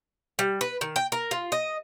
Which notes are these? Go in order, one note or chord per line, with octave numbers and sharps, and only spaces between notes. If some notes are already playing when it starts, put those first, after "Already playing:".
G3
B4
D#3
G5
A#4
F4
D#5